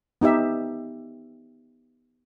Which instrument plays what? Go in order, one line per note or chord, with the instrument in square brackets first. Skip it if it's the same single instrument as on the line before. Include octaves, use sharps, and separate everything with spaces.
[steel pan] B3 D#4 G4 E5